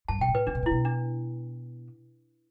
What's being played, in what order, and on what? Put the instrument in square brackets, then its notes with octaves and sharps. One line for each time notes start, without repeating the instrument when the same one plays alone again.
[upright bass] G2 [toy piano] A5
[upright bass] B2 [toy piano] G5
[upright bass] A2
[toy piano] B4
[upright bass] D3 [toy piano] D4
[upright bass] B2
A2
[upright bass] B2 [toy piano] E4
[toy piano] D4